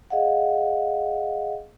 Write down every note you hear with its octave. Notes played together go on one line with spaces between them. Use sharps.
G#4 D#5 F5 F#5